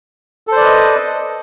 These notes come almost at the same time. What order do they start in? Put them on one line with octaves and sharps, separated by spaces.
A4 C5 D5 B4 D#5